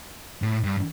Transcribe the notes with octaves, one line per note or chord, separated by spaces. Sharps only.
A2
G2